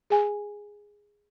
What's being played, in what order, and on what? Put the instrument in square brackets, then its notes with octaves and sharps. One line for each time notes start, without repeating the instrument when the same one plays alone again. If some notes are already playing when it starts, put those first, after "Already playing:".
[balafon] G#4 G#5